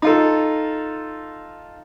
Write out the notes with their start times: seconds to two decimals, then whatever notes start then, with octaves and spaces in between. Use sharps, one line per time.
0.02 D#4 F4 A4